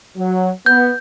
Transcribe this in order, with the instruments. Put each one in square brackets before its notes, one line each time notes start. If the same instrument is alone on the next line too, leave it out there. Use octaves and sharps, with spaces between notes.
[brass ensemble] F#3
[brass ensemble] B3 [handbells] G6